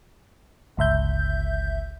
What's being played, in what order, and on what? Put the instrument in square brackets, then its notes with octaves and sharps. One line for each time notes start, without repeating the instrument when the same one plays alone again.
[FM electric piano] G1 C#2 E5 G6